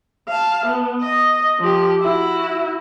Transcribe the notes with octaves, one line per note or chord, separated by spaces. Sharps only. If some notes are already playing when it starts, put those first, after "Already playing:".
F5 A5
B3
D#5
F3 G4
E4 F#4